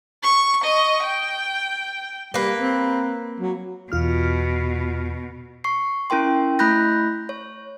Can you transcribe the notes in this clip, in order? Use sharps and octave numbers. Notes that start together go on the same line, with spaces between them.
C#6
D#5 C#6
G5
G3 A#3 B4
C4
F#3
E2 B2 F4 F6
C#6 C7
C#4 E4 A#4 G5 C6
A3 E4 B5 F#6 G6 A#6
C#5